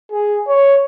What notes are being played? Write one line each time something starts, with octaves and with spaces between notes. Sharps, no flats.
G#4
C#5